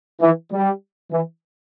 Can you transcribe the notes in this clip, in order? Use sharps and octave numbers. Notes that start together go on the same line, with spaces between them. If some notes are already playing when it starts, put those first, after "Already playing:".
E3
G3
E3